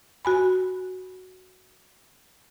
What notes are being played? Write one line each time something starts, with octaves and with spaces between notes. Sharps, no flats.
F#4 G#5 B5